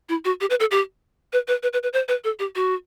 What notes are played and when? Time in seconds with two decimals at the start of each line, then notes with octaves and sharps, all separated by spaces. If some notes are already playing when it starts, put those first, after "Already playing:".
0.09 E4
0.25 F#4
0.41 G4
0.50 B4
0.60 A4
0.71 G4
1.33 B4
1.48 B4
1.63 B4
1.73 B4
1.83 B4
1.93 C5
2.08 B4
2.24 A4
2.39 G4
2.56 F#4